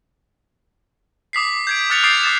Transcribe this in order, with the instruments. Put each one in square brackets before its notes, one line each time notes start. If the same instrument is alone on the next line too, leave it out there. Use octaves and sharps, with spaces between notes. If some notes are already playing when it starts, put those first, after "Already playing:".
[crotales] D6 D#6 B6 C7
G6 G#6 D7
D6 F6 F#6 A6 C#7 F7
D6 D#6 G6 A6 C7 D7
D6 A6 E7